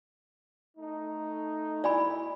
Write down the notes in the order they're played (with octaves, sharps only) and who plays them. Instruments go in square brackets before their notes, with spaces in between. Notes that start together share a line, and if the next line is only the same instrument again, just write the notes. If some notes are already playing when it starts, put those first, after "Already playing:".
[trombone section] A3 D#4
[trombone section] E4 [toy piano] D5 G#5 B5